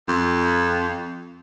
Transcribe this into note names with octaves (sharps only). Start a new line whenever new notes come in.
F2